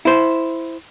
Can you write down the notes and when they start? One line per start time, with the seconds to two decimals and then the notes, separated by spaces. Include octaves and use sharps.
0.05 E4 C5